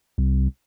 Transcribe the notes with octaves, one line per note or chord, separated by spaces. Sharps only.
C2